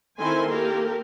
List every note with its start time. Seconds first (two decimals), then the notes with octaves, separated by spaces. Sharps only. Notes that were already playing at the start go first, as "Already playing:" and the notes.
0.19 D#3 C4 E4 A4 G#5 C6
0.49 A#3 G4 A4 A#4